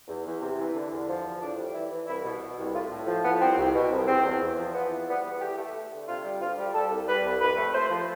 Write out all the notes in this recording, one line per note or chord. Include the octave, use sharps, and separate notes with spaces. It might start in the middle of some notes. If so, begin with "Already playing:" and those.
E2
E2
C3
E3
D3
E2
F3
E2
A2 D4
G3
E3 E4
E3
C2 E4
B2
B2
C2
A2 F4
A2
F3
A2 B3
C2 C4
C2
B2
C2
E2 C4
E2
E2
F3
E3 B3
E3
G3 B3
E2
A3 G4
A3
A3
D3
C3 F4
G3
D2 F4
G3
G3 A4
C2
G3 B4
C2
F2 B4
A3
A3 C5
F3